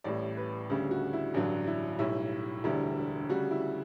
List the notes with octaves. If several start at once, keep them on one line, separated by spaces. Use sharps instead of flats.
A1 A2 G3 D5
B4
D2 C#3 G3
F#4
E4
A1 G2 D3 F#3 D4
E4
B1 A2 G3 E4
E1 D2 D3 G3 E4
D2 C#3 G3 F#4
E4